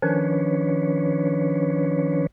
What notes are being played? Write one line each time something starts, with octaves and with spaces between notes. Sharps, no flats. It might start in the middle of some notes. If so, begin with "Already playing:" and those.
D#3 F3 C#4 D4 B4 C#5